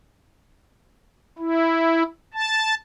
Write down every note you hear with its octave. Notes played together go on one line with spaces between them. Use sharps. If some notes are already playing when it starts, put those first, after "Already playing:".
E4
A5